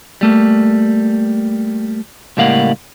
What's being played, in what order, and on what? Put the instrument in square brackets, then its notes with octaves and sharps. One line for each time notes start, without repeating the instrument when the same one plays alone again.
[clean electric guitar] G3 A3 A#3
C#2 A2 G3 A#3 F5 F#5